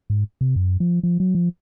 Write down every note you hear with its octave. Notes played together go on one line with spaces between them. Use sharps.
G#2
C3
F#2
F3
F3
F#3
F3